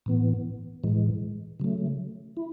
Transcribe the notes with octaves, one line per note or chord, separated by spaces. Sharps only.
A2 E3 B3
A2 E3 G#3
C#3 F#3 A3
E4